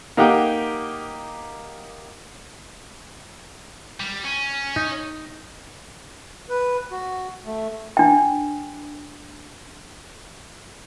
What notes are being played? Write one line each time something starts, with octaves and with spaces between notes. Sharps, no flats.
A#3 D#4 G4 F#5 G5
G3
C#4
D#4
B4
F#4
A3
D4 G5